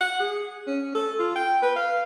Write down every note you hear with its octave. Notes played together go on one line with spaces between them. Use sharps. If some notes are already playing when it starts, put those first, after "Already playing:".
F#5
G#4
C#4
A4
F4
G5
B4
F5